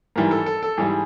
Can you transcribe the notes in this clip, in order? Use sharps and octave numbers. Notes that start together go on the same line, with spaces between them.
G#2 E3 G3 A#4
A4
A4
A4
G#2 E3 G3 G#4